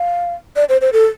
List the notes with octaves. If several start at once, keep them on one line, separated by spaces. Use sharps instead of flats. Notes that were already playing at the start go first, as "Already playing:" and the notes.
Already playing: F5
D5
C5
C5
A4